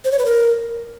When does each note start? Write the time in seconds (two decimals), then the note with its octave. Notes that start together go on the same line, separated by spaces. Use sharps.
0.05 C5
0.12 C#5
0.19 B4
0.26 A#4